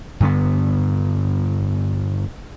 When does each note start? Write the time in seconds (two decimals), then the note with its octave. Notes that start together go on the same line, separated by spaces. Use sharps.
0.20 G2 D3 B3